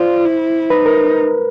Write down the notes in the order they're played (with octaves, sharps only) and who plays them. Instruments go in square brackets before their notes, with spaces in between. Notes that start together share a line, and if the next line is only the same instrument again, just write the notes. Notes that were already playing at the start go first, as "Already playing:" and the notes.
Already playing: [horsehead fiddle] F4 [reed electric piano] C5 D5
[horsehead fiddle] E4
[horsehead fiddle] D#4 [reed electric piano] B4
[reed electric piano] A#4